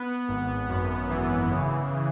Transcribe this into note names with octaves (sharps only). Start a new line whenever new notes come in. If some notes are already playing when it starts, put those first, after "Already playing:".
Already playing: B3
G#1
F#2
E3
C#3
C#3